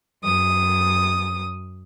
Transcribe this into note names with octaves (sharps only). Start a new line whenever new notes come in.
F#2 D#6